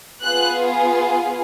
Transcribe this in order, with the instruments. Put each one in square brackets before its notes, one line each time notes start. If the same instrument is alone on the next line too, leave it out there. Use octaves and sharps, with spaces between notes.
[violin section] B3 F4 G#4 F#6